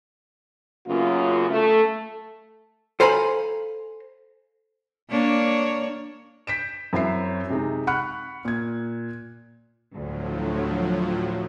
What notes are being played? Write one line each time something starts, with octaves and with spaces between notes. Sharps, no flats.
F#2 C#3 A#3 B3 F4
A3
A4 C5 F5 G#5 A#5 B5
A#3 D4 C#5
G6 B6 D7 E7
F#2 C4 E4 C#5 E5 C7
C3 G#3 D#4
F#5 B5 C#6 F6 F#6 C#7
A#2 G#6
D2 A2 F3 F#3